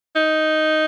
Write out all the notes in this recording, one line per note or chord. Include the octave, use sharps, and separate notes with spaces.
D#4